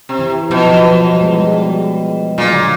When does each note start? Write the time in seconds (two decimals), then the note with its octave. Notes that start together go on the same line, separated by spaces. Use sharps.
0.09 C3
0.19 E3
0.50 B2 F3
0.59 F#3
0.69 F3
0.78 F#3
0.87 F3
1.13 G3
1.21 G#3
1.29 G3
2.38 A#2 F#3
2.54 D3